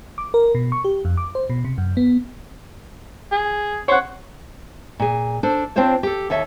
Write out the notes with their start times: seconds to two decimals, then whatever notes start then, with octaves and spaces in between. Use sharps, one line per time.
0.18 D6
0.34 A#4
0.55 B2
0.72 C#6
0.84 G4
1.05 F2
1.17 D6
1.35 C5
1.50 B2
1.65 C3
1.78 F#2
1.97 B3
3.32 G#4
3.88 C5 C#5 F#5
4.99 A#2 G#4
5.43 D4 A4 C5
5.76 C4 D4 F4 C5 C#5
6.03 G4 A4
6.30 D#2 A4 C#5 E5